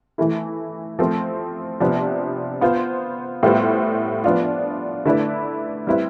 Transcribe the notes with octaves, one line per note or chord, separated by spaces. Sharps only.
E3 A3 E4
F3 A3 C4
C3 F3 B3 D4
B3 F4 C5
A2 G3 B3 F4 C5
F3 B3 D4 F4
D3 A3 E4 B4 D5
G3 C4 E4 B4 E5